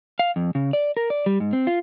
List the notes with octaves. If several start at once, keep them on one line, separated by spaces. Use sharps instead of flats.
F5
F2
C#3
D5
A#4
D5
G3
G#2
C4
F4